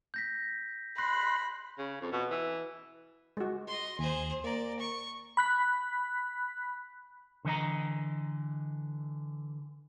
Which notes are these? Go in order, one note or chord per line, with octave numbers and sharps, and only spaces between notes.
G6 A#6 B6
B5 C6 F#6 A#6
C#3
F2
B2
E3
G#3 F#4
D#5 C6
D#2 G#4 C5
A#3 D5 A#5
C#6
B5 F#6 B6
D3 E3 D#5 A#5